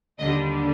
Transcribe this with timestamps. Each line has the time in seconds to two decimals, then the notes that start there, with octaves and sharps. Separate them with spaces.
0.19 D#2 D3 G3 D#5